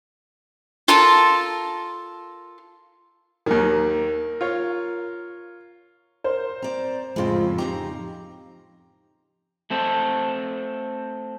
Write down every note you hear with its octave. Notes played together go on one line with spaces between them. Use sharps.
F4 A4 A#4 A5
D#2 D#3 A#4
F4 C#5
A#4 C5
C4 D5 A#5
F2 A2 C#3 F3 G#3 C4 F4
C#3 C4 D#4 G4 A#5
A3 C4 A4